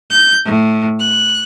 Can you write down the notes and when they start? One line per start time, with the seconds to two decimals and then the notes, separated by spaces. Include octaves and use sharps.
0.11 G6
0.45 A2
0.98 F#6